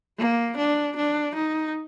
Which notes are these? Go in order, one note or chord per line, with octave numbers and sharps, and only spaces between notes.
A#3
D4
D4
D#4